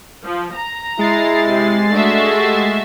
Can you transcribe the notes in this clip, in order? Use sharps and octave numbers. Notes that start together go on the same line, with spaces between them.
F3
A#5
G#3 E4 A6 C7
C3
A3 D4 F#4 E5
G4